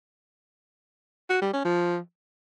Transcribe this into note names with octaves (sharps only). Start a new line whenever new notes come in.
F#4
G3
C#4
F3